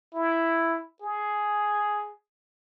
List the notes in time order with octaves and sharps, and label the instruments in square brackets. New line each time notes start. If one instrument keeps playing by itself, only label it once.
[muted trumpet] E4
G#4